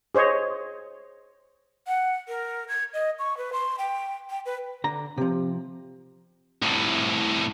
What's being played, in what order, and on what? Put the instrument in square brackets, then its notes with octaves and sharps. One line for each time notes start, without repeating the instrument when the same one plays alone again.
[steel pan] G#4 C5 C#5 D#5
[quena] F#5
A#4
G#6
D#5
C#6
B4
C6
G5
G5
B4
[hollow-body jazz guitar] D3 A#5
[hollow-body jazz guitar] C3 F3 [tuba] C4
[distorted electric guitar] C2 A2